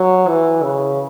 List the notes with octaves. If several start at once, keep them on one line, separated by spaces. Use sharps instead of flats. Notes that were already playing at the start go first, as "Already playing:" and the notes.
Already playing: F#3
E3
C#3